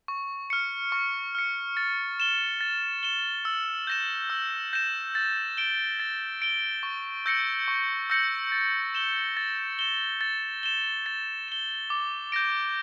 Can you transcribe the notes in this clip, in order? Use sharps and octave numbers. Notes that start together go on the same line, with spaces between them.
C#6
F6 C#7
C#6
F6 C#7
A6
E7 G7
A6
E7 G7
E6
G6 A#6 E7
E6
G6 A#6 E7
A6
D7 G7
A6
D7 G7
C#6
E6 G6 A#6 C#7
C#6
E6 G6 A#6 C#7
A6
E7 G7
A6
E7 G7
A6
E7 G7
A6
E7 G7
D6
G6 A#6 D7